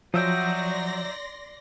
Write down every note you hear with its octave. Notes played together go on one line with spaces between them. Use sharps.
F3 F#3 D#4 D5 E5 G5 C6 A#6